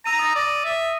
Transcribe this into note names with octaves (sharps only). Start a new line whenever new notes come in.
A#5 E6 A#6 D#7
D#6 A6 A#6
D5
E5